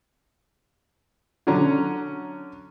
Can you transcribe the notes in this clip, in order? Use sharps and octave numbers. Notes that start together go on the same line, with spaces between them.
D3 F#3 C#4 A#5